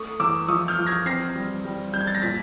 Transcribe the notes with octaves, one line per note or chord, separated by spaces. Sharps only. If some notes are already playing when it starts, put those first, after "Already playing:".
Already playing: A3 C#6 D#6
E2 D6 E6
F3 C#6 D#6
F6 G6
F3
G#6 A#6
C4 A#6 C7
G3
G3
G3 G6
G#6
A6
A#6
A#2 A6 B6